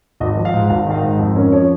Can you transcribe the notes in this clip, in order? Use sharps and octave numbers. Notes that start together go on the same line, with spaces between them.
G#1 D#5
F3
F5
G#2
G#1 F5
D#3 F5
D#5
G#2
F2 D#5
C#4 A#4
F3 C#5